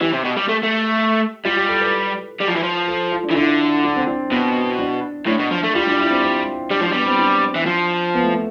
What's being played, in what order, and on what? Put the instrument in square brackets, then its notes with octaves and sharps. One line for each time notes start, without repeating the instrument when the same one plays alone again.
[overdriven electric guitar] E3 [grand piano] G4
[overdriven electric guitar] C3
B2
G3
A3
A3
[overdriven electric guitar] G3 [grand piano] F4
[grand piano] G4
A4
B4
[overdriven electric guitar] G3
F3
E3
F3
[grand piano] A4
F4
D4
[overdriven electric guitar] E3
[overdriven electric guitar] D3 [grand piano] E4
[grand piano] D4
C4
D4
[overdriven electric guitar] B2 [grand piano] B3
[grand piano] D4
[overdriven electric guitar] A2 [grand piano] D4
[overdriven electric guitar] B2
F3
A3
[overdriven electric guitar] G3 [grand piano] F4
[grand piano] D4
E4
C4
C4
[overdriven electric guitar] G3 [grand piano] D4
[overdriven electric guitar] F3 [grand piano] D4
[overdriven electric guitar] G3 [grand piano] B3
[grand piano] C4
D4
[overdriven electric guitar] E3
F3
[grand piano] B3
A3
B3